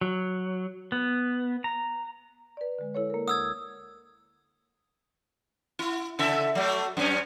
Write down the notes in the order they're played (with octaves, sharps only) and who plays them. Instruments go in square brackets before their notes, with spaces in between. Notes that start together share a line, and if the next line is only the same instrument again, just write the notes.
[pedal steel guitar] F#3
B3
A#5
[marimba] B4 D5
D3 G#3
E4 A4 C#5
A#3 A#4
[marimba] D2 [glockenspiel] D#6 E6 G#6
[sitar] E4
C#3 A4 E5
F#3 A3
F#2 C#4